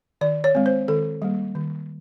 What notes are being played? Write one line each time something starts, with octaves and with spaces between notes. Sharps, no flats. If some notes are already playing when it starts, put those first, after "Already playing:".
D#3 D5
C#5
G#3 C4
C5
D#3 A4
G3 A#3
D#3